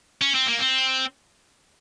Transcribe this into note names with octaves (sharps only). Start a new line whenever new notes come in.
C#4
C4
A#3
C4